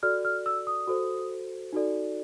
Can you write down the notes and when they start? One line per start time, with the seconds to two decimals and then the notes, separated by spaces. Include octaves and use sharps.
0.03 F#4 A4 D5 F6
0.25 F6
0.46 E6
0.67 D#6
0.87 F#4 A4 C5
1.73 D#4 F#4 A4 D5